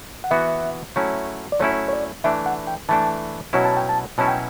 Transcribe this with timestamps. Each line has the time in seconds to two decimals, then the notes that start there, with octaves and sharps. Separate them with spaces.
0.24 F#5
0.31 E3 B3 F#4 E5
0.96 F#3 A3 C#4 E4
1.52 D5
1.60 F#3 A3 C#4 E4 C#5
1.88 C#5
1.93 D5
2.24 E3 A3 D4 E5
2.46 F#5
2.67 G5
2.89 E3 A3 D4 A5
3.53 B2 F#3 C#4 E4
3.65 A5
3.77 G5
3.89 A5
4.18 B2 F#3 C#4 E4 A5
4.28 G5